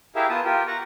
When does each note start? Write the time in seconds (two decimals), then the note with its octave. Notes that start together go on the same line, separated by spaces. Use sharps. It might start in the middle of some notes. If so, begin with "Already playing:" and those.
0.16 E4 G4 G#4 A#4 E5 F5
0.29 B3 F4 B4 A5 D#6
0.45 F4 G4 A#4
0.67 F#5 A#5 C#6